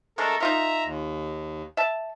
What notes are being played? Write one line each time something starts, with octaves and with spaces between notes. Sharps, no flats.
G#3 A3 D4 A4 A#4
D#4 F4 A#4 E5 A#5
D#2
E5 A5